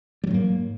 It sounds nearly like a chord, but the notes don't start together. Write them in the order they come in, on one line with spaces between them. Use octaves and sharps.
G3 F#3 G#2 A#3